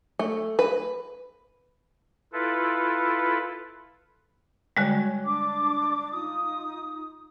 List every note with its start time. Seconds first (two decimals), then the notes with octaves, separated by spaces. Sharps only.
0.19 A3
0.59 B4
2.33 E4 F4 A4 B4
4.77 D3 G3 G#3 F#4 C#5
5.24 D4 D6
6.11 D#4 F4 D#6